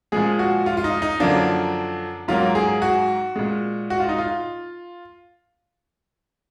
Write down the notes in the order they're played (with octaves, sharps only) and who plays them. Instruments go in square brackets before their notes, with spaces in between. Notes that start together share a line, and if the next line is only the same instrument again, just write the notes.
[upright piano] A#2 F3 G#3 G#4
F#4
F4
F4
D#4
D#4
F#2 D3 F3 A#3 D4
G#2 F#3 A#3 F4
G#4
F#4
A#2 G#3
F#4
F4
D#4
F4